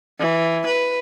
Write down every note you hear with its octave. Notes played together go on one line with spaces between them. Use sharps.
E3
B4